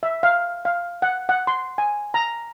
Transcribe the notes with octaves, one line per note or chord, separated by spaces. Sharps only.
E5
F5
F5
F#5
F#5
C6
G#5
A#5